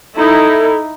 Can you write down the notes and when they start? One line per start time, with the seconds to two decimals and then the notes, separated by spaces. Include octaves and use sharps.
0.17 D#4 E4 A4